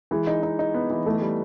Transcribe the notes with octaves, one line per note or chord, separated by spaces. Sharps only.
E3 G#3
D#4
D#4
D#4
B3
E3
E3 A3
G3